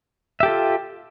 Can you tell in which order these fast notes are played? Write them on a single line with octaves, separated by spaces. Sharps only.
E5 G4 A4 F4